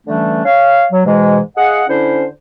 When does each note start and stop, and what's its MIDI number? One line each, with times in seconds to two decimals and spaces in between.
0.07 0.41 50
0.07 0.41 52
0.07 0.41 55
0.07 0.41 57
0.07 0.41 61
0.07 0.41 62
0.45 0.85 73
0.45 0.85 77
0.92 1.02 54
1.06 1.39 44
1.06 1.39 47
1.06 1.39 52
1.06 1.39 56
1.57 1.84 68
1.57 1.84 75
1.57 1.84 77
1.57 1.84 78
1.88 2.25 50
1.88 2.25 61
1.88 2.25 64
1.88 2.25 72